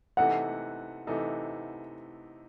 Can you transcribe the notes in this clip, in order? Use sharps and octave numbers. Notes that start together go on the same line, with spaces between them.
C3 E3 A3 D#4 A4 F#5
C3 E3 A3 D#4 A4